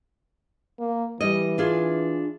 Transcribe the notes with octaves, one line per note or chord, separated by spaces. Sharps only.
A#3
E3 G3 D#5
D4 F4 G#4